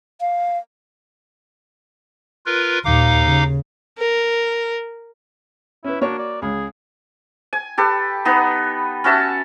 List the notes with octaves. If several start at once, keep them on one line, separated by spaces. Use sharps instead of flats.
F5
F4 A#4 B4
D#2 A#2 D#4 F5 D6
C#3
A#4
C#4 E4 B4
A#3 D4 F#4 C#5
D5
C#2 G#4
G#5
G4 A4 B4
B3 D#4 B4
C#4 F#4 E5 A5